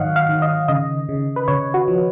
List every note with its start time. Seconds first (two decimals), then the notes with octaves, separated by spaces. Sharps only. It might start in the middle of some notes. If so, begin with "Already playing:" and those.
Already playing: G#2 D#3 F#3 C#5 D#5 F5 F#5
0.16 F5
0.29 D#3
0.42 D#5
0.68 C#3 D#5
1.09 C#3
1.36 B4
1.48 C#3 C#5
1.74 F#4
1.88 F3